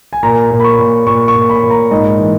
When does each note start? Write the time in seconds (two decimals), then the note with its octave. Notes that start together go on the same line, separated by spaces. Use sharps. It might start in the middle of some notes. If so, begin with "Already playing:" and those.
0.13 G#5
0.23 A#2 A#5
0.51 A#2
0.60 B5
0.64 C#6
0.79 A#2
1.07 A#2 C#6
1.28 C#6
1.36 A#2
1.50 B5
1.63 A#2
1.70 A#5
1.91 G#2 D#5
2.19 E3